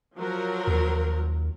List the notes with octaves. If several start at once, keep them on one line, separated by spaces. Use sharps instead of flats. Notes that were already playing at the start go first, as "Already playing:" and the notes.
F3 F#3 A#4
D#2